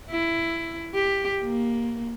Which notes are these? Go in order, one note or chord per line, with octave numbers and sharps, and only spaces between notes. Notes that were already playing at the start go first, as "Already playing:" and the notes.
E4
G4
A#3